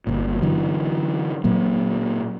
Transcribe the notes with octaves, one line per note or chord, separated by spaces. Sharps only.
G1 A#2
D3 E3 F#3
A#2 F#3 A#3